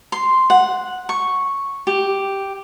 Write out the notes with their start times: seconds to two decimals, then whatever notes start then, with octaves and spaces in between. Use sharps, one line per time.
0.12 C6
0.50 F#5
1.09 C#6
1.87 G4